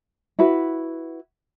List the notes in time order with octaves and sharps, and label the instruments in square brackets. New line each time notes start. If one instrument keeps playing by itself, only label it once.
[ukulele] E4 F#4 B4